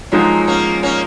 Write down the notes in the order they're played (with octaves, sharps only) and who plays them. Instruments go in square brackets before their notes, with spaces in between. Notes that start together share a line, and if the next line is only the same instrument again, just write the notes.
[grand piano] F3 G#3 D#4 G#4 [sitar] F#3 A#3
[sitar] A#3 C#4
A#3 C#4